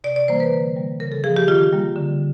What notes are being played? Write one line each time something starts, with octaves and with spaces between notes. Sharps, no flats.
C3 D5
D5
E3 G3 A#3 C5
B4
D3
G3 A#3
C#3 A#4
A4
F3 A#3 G#4
G4
D#3 F4
G3 A#3
D3